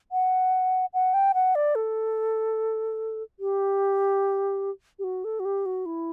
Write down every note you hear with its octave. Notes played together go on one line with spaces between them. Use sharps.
F#5
F#5
G5
F#5
D5
A4
G4
G4
F#4
A4
F#4
G4
F#4
E4